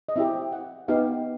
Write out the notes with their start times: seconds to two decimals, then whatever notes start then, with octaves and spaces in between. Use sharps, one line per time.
0.09 D#5
0.16 C4 E4 G4 E5
0.52 F#5
0.88 B3 D#4 G4 F5